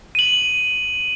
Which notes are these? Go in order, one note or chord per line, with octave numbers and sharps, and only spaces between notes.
D#7 F#7